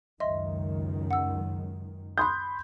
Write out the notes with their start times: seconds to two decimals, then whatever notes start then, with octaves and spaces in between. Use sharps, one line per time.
0.20 C#2 F#2 D#3 D#5 E5 C6
1.11 F#5 E6
2.18 B5 C6 D#6 F#6 G6